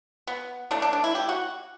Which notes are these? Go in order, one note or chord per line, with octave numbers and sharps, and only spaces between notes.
B3
E3 A3 D4
D4
D4
E4
G4
F#4